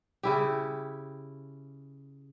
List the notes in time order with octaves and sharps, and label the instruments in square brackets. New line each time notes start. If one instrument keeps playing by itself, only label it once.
[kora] C#3 E4 G4